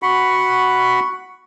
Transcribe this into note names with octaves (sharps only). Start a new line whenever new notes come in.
F#4 F#5 B5